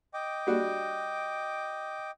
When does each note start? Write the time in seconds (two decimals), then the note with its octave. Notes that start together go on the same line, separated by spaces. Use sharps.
0.14 D#5 G5 D6
0.47 G3 D4 F#4